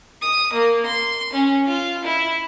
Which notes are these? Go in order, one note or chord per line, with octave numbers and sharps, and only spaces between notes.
D#6
A#3
C6
C#4
F4
E4